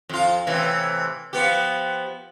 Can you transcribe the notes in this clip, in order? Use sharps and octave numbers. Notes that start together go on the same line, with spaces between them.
F2 F4
A2 C3 E3
F3 B3 G4